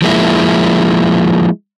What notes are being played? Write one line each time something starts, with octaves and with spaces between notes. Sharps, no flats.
F3 G#3 A#3 E4